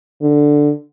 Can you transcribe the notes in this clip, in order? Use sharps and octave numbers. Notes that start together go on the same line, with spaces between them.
D3